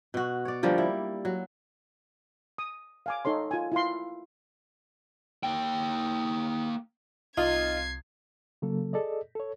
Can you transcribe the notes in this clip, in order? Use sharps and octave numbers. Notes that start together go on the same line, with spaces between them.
B2 F#4
C#5 D5
D3 F3 G3 A#3
E4
F#3
D#6
F5 G#5 D6
D#4 A4 C#5 C6
F4 G#5
E4 F4 F5 C6
A#3 G5
C2 D#4 F4 G#6 C7
C#3 F#3 A#3 A4
G#4 A4 D5 D#5
A4 C#5